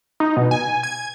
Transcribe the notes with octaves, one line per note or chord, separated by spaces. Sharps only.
D#4
B2
G#5
G#6